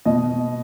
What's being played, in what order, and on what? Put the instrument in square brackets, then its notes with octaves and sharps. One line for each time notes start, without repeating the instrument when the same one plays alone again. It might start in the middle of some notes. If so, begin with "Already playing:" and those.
[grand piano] B2 D#5